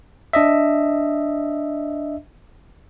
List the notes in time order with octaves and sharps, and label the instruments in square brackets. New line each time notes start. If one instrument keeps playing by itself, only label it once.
[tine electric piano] D4 D#5 E5